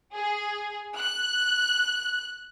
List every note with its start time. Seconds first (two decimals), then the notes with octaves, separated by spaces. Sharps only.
0.14 G#4
0.97 F#6